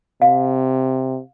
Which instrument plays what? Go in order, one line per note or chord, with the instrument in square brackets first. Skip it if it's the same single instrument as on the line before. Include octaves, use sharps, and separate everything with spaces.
[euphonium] C3 [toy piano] F5